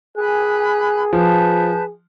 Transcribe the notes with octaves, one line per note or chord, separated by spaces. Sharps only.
G#4 G#5 B5 F#6
F3 B4 A5 G6